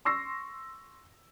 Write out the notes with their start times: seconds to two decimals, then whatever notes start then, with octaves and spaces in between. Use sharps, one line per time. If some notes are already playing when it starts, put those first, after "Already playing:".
0.05 C6 C#6 E6 A#6 C7